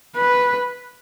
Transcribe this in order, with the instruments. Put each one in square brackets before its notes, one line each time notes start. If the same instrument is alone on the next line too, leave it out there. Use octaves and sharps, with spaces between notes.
[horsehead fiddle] B4